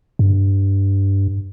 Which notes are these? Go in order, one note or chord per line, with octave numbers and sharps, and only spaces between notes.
G2